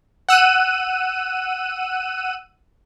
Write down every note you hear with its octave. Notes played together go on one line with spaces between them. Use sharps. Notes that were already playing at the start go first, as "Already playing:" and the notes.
F#5 E6 F#6 D#7